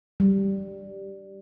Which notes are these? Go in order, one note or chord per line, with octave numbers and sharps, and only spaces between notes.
G3